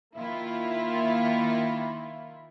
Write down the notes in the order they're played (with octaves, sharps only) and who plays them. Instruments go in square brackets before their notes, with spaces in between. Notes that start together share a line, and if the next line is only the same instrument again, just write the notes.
[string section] D#3 A#3 E4 F4